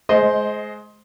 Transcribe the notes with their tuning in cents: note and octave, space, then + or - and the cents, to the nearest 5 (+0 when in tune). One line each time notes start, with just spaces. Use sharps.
G#3 +25 C5 -5 D#5 +0